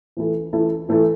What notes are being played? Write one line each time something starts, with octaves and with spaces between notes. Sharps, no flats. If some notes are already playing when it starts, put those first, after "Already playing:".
E3 A3 E4 A4
E3 A3 E4 A4
E3 A3 E4 A4